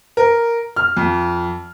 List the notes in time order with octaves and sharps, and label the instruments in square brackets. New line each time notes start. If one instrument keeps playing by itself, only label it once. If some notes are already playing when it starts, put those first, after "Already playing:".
[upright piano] A#4
F6
F2